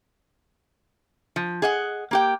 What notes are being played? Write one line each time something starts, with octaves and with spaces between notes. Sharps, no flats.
F3
G#4 D#5 F#5
A#3 G4 G5